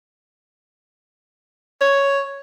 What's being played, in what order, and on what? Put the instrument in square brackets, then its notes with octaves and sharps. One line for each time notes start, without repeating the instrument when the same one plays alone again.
[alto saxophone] C#5